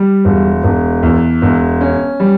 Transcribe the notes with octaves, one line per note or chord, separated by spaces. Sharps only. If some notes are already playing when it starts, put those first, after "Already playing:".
Already playing: G3
E1
E1
E2
E1
C#4
G3